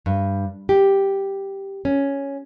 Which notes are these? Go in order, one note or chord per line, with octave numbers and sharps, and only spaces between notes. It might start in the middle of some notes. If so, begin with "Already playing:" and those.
G2
G4
C#4